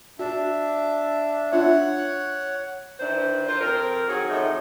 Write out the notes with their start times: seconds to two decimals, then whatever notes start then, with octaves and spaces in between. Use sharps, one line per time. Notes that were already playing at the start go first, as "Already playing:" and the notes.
0.19 D4 F#4 E5
1.52 D4 F4 C#5 E5 F#5
2.99 D#3 E3 D4 C5
3.47 F4 A#4 C5
3.60 F2 C4 A#4
4.07 D#3 F#3 F#4 G#4
4.29 F2 A2 A3 D#4